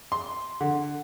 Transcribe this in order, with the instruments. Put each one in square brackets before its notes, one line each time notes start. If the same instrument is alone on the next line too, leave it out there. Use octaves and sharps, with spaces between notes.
[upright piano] C6
D3